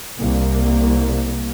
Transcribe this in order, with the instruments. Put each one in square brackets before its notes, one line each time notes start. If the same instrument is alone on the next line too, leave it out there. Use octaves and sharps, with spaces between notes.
[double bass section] C2 A#3